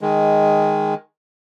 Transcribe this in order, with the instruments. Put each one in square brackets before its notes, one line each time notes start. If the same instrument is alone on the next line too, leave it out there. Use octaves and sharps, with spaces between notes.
[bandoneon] D#3 G#3